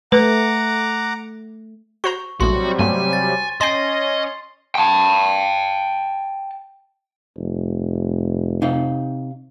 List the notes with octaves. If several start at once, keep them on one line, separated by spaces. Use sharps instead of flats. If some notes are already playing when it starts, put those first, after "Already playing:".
A3 B4 F#5 A#5 D6
F#4 C5 A#5 C#6
A#1 A2 C3 F#3 G3 F#4 C6
G2 A3 B3 G#5
A6
C#4 D#5 G5 G#5 C6 A#6 C7
G5 A5
F1
C3 D#4 F5